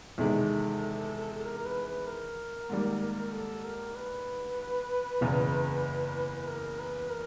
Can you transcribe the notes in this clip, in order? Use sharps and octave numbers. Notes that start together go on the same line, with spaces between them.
E2 C3 D#3 G#3 A4
A4
A#4
A#4
B4
B4
A#4
G#2 D#3 G3 A#3
A4
A#4
B4
F#1 E2 C#3
B4
A#4
B4
A#4